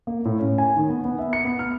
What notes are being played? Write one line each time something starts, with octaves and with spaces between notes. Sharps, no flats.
A#3
A2
C#4
G#5
D#3
B3
B3
E5
C#7
B3
F6